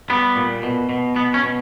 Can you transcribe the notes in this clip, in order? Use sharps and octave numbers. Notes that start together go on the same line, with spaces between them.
G3 B3
A#2
B2
B2
B2 B3
C#4
B2